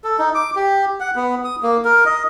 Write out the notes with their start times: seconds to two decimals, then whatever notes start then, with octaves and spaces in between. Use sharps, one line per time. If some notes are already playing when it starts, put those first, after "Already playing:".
0.04 A4
0.19 D#4
0.35 D6
0.56 G4
1.00 F#5
1.16 B3
1.44 D#6
1.63 A#3
1.85 A#4
2.06 D#5